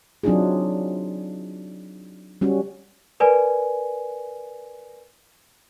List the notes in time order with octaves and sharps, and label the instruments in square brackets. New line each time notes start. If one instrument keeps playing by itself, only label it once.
[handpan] F#3 C4 D4 D#4 F4 G#4
G3 C#4 F#4
[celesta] A#4 B4 D5 G#5